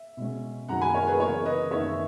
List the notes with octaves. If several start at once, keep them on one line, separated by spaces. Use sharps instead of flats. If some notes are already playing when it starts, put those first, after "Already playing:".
Already playing: E5
B2 G#3 C#4
F#2 D#3 F#3 C#4 F#5 A#5
G#5 B5
A#4 C#5
G#4 B4
C#3 E3 B3 A#4 C#5
B4 D#5
F#2 D#3 A#3 C#4 C#5 E5